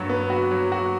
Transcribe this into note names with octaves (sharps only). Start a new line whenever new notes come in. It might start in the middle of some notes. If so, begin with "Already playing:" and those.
Already playing: G2 F#3 F#4
B3
F#4
F#3
F#4